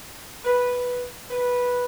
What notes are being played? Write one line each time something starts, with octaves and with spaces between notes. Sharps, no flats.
B4
B4